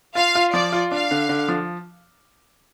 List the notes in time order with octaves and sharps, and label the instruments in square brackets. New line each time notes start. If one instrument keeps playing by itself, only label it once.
[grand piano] F4 [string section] F5
[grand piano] F4
[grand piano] F3 [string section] D5
[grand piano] F4
[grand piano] D4 [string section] F5
[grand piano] D3
D3
F3